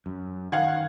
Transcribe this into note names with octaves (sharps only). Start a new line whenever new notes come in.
F#2
D#3 F5 F#5 G#6